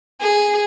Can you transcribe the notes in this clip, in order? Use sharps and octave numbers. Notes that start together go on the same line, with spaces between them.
G#4